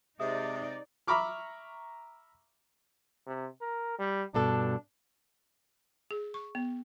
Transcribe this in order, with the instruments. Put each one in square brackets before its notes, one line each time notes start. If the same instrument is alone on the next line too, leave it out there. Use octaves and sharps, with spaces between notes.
[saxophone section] C3 G#3 [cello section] D#4 D5 [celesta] E5 D#6
[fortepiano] E5 A#5 B5 C#6 D6 F6
[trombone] C3
A#4
G3
[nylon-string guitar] G2 B2 A4 [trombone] D4
[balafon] G#4
C#6
B3